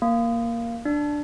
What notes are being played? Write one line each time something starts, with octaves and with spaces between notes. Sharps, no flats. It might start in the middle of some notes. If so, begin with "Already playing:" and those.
A#3
D4